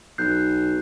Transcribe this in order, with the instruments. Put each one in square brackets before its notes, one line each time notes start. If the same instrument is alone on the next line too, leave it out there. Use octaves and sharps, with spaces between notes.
[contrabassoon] B1 [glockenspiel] F#6 G6 C7